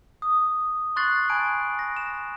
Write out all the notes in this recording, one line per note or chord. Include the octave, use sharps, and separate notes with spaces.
D#6
C6 C#6 F#6 A6 C7 F#7
G#5 A5 B5 G#6 D7
A#6
E7